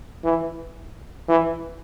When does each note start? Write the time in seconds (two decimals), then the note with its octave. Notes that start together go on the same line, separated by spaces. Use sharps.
0.24 E3
1.28 E3